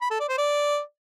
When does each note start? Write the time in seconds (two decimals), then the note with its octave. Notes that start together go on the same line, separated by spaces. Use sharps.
0.01 B5
0.10 A4
0.20 D5
0.29 C5
0.38 D5